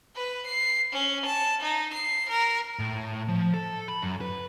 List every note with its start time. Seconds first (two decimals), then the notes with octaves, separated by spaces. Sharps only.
0.16 B4
0.46 C7
0.93 C#4
1.25 A5
1.62 D#4
1.93 C7
2.29 A#4
2.79 A2
3.28 F3
3.54 A4
3.88 B5
4.02 F#2
4.21 B4